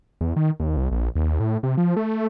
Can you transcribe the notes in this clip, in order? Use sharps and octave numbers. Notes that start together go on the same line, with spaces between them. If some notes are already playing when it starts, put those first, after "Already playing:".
E2
D#3
D#2
C2
A#1
D#2
A2
C3
F3
A3